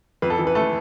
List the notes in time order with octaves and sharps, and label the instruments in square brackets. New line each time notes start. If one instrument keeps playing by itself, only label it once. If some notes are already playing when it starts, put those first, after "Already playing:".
[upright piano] F2 B4
A4
E3
B4
A3 A4